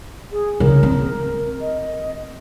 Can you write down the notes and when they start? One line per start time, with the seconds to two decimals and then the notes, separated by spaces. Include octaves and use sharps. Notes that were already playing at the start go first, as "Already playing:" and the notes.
0.32 G#4
0.60 C#3 D4 A#4
0.83 C4
1.61 D#5